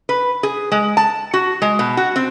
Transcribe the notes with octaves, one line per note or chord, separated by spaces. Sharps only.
B4
G#4
G#3
A5
F#4
G#3
B2
F#4
C4